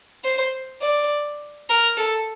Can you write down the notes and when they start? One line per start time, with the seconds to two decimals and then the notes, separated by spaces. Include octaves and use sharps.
0.25 C5
0.82 D5
1.69 A#4
1.97 A4